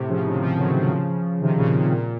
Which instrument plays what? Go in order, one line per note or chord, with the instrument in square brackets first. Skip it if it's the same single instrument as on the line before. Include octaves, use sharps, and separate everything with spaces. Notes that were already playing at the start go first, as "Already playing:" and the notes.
Already playing: [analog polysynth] A2 C3
C#3 F3
C3 D#3
C#3 F3
D#3 F#3
C#3 F3
C3 D#3
A#2 C#3
A#2 C#3
A#2